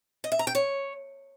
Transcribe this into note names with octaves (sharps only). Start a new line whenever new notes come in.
D#5
E5
A#5
G5
C#5